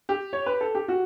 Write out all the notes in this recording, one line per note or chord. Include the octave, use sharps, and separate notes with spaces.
G4
C#5
B4
A4
G4
F#4